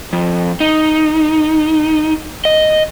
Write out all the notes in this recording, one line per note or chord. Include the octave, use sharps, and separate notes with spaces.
F2
D#4
D#5